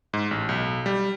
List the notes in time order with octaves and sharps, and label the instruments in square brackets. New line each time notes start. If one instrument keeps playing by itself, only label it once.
[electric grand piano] G#2
A1
B1
G3